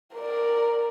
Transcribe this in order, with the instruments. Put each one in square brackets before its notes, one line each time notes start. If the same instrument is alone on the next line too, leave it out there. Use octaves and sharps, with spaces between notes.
[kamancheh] A#4 D5